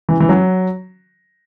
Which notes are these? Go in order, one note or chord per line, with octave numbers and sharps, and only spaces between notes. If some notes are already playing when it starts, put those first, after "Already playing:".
E3
E3
F#3